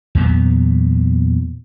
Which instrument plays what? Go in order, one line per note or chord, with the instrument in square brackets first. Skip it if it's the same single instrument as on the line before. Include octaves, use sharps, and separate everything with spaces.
[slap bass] E2 A#2 F#3 B3